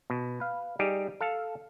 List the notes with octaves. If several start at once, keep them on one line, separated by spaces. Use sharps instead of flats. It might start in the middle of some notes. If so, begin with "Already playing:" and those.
B2
B4 F5
G3 D#4 G4 G#4
A4 F5 A5